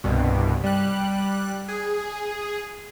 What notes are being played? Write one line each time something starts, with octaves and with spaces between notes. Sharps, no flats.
C2 G2 B2
G3 F#6
G#4